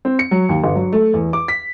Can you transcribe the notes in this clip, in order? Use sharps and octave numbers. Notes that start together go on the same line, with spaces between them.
C4
C#7
F#3
D#2
G1
F#3
A3
E2
D6
B6